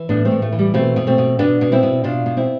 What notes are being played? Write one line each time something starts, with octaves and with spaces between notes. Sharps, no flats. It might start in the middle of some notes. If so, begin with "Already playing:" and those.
Already playing: E3
A2 B3 D4
A3 C4
A2
A3
E3
G3
B2 A3 C4
B2
A3 C4
B2
B2 B3 D4
B2
C4 E4
B2
B2 D4 F4
B2
C4 E4